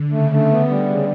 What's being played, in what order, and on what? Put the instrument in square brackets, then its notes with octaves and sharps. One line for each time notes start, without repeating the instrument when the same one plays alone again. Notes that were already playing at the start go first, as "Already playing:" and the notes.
Already playing: [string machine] D3
[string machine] C#3 [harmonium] A3
[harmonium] A3
[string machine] D3 [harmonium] B3
[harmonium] G3
C#3